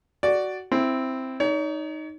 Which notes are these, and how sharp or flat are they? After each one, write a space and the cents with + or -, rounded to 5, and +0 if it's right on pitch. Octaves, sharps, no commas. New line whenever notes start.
F#4 +10 D5 +0
C4 +0 E4 +5
D#4 +0 C#5 +40